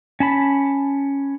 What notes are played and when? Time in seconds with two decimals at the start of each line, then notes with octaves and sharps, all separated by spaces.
0.20 C#4 A5 B5